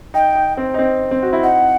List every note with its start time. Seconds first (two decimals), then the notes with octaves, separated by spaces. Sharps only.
0.14 D#4 G5
0.35 D#4
0.57 C4
0.74 D#4
0.79 C4
1.11 C4
1.23 F#4
1.33 E4
1.43 D#4 F#5